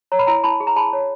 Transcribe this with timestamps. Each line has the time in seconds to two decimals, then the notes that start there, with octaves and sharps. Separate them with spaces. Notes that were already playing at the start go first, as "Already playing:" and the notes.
0.12 C#5 A#5
0.19 B5
0.27 E4 G#5 A#5
0.43 E4 A5 B5
0.60 G#4
0.67 A#5
0.76 G#4 A5 B5
0.93 C#5